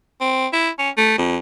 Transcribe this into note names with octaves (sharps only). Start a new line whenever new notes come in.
C4
E4
C#4
A3
F2